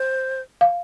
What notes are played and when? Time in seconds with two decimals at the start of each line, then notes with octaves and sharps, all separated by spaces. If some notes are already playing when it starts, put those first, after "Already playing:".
Already playing: C5
0.61 F5